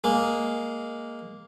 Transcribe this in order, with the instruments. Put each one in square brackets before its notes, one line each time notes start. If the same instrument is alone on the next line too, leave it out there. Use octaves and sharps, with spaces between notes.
[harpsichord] G#3 A#3